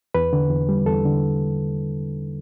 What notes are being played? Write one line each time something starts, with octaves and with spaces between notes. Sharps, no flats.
E2 B4
D3
E2
G3
E2 A4
D3